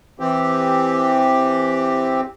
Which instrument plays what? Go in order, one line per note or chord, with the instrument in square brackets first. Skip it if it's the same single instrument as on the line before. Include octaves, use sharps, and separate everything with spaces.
[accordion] E3 C4 G4